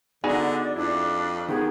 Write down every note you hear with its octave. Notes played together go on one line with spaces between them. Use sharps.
D3 B3 D#4 F#4 G#4 D5
F2 D4 E4
D#3 B3 G4 G#4